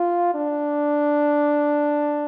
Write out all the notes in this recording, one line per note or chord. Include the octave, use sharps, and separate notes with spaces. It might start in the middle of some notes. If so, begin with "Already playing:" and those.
Already playing: F4
D4